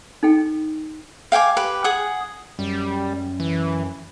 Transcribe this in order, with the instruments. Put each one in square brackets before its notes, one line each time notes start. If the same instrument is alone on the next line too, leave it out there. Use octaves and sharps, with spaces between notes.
[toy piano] D#4 A4 G5
[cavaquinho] F5 G5 G#5 D6
G4 B4
G#4 F#5 D#6
[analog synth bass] F#2 [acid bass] G3
[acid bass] E3